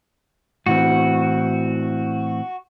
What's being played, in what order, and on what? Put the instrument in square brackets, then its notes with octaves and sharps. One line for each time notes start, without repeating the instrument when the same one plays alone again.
[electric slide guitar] A2 E3 C4 [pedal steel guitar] F#4